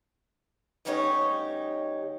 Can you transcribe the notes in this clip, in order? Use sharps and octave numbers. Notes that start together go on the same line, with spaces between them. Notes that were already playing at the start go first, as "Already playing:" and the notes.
D2 G2 C#4 D#4 G4 C#5